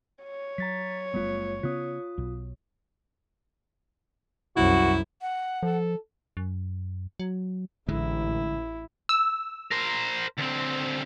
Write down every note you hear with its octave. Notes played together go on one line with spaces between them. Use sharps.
C#5
F#3 A#5 A6 B6
F#1 G3 A3 B3 F4
C#3 B3 C#4 F4 D#6
B1 B2
C2 F#2 E4 F#4
F#5
F3 A4
F#2
F#3
A1 D3 G#3 E4
E6
A#4 C5
D2 C4